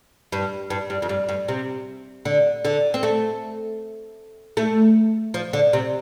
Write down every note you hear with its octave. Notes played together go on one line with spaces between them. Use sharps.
G2
G2
G2
F2
G2
G2
C3
D3
D3
C4
A3
A3
F3
D3
C3